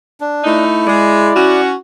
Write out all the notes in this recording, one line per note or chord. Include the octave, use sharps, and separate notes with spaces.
D4
A3 D#4 E4
G#3 D5
C#4 F#4